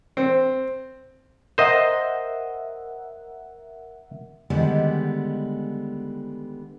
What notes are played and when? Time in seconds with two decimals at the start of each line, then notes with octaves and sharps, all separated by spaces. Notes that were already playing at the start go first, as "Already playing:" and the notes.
0.17 C4
1.58 A#4 C5 D#5 E5 F#5
4.50 D3 D#3 G3 G#3 B3